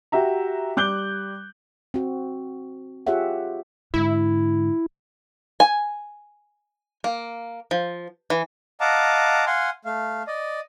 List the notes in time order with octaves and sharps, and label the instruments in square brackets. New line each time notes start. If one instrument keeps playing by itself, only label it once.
[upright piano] F#4 G4 E5 A#5
G3 D6 F#6 G6 G7
[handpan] C4 F#4
F4 G4 G#4 C#5 E5 F#5
[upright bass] G#2 D3 [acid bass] E4
[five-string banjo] G#5
A#3
F3
E3
[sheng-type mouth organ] D#5 F5 F#5 A5 A#5 D6
F5 F#5 G#5 C6
A3 F5
D5 D#5